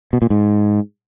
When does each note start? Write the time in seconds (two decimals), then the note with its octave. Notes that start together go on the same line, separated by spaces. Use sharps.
0.13 B2
0.22 A#2
0.30 G#2